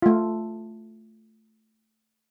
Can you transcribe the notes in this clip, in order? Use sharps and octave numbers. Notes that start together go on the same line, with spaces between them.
A3 F4